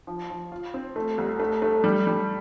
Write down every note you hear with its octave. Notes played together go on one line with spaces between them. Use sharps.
F3
F3
F4
C4
A3
C2
A3
A3
G3
G3